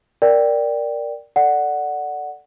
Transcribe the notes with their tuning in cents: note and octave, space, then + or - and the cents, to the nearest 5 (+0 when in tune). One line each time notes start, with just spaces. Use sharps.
A#4 +0 D5 +0 G5 +0
A4 +0 D5 +0 F#5 +0